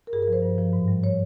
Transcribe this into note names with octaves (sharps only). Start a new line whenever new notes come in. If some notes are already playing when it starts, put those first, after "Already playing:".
A#4
G2 G#4
A#4
F3 C5
G2
F3
G#2
G3
C#5